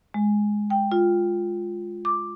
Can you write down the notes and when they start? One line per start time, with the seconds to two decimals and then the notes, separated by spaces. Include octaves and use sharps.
0.14 G#3
0.70 G5
0.92 F4
2.05 D6